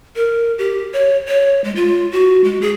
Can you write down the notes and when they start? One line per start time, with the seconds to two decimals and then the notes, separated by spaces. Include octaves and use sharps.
0.16 A#4
0.58 G4
0.93 C#5
1.28 C#5
1.64 G#3
1.76 F4
2.12 F#4
2.44 G#3
2.62 G#4